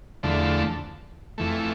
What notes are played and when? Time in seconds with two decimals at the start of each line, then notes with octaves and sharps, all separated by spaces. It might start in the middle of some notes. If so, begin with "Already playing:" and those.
0.23 E2 D3 F3 A3
1.38 F2 E3 A3